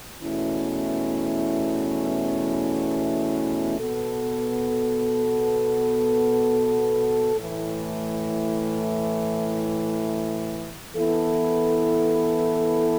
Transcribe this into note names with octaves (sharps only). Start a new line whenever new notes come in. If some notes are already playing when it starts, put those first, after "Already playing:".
E2 B2 A3 C#4 E4
B2 B3 A4
A2 E3 A3
E3 B3 E4 A4